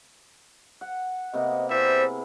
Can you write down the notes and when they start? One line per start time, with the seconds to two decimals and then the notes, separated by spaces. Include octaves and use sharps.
0.81 F#5
1.34 C3 A#3 B3 D#5
1.70 G3 C4 E4 G#4 C5 E5